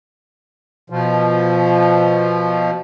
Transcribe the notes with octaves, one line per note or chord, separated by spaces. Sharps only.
B2 F3